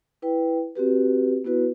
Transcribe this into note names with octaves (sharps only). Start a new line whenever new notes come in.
E4 B4 G5
C4 F#4 G4 B4
B3 E4 F#4 B4